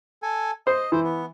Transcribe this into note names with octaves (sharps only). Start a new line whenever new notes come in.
A4 G#5
C5 D#5
E3 C5
B3